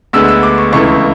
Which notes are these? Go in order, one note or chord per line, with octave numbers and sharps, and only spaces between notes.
D2 D3 G#3 B3 E6
E6
D6
C#6
C#2 C#3 E3 A3 C#6